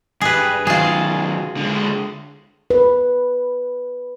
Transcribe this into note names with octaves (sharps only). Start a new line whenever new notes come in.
G2 G#4 B4
D#3 F#3 F4 G#4
D3 G#3
B4